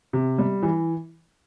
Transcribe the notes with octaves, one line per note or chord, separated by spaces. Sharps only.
C3
G3
E3